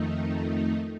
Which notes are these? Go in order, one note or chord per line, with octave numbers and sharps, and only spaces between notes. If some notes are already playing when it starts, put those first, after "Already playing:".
Already playing: F2 D#3 A3 D#4